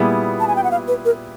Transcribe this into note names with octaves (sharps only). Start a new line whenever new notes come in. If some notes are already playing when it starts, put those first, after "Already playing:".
Already playing: A#2 G3 B3 E4 G#4
A5
G#5
G5
F#5
F5
B4
A#4